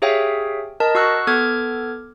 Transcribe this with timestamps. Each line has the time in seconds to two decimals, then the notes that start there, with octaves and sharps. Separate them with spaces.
0.02 G4 G#4 C#5 E5 F5 G5
0.80 A#4 D#5 A5
0.95 F#4 C#6 E6 F#6 A#6
1.27 B3 A4 D6 F6 G#6